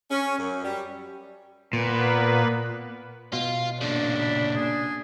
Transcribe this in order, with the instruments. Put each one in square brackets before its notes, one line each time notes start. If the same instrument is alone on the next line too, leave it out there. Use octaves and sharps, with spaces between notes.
[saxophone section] C#4
F#2
G3
[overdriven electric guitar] A#2 [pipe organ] A#3 B3 B4
[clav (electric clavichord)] B2 [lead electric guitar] F4
[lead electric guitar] A#2 C#3 [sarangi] D4
[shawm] B5
G#4